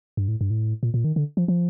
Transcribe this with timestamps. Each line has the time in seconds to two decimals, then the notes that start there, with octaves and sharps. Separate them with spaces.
0.17 G2
0.28 A2
0.41 G2
0.50 A2
0.83 A#2
0.94 A#2
1.04 D#3
1.16 D3
1.37 F3
1.48 F3